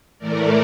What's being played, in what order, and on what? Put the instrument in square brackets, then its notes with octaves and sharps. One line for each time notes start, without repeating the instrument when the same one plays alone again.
[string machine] A2 E3 A3 A#4 D5